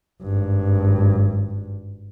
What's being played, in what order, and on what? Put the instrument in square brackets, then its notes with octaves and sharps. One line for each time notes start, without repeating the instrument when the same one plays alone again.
[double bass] G#1 G2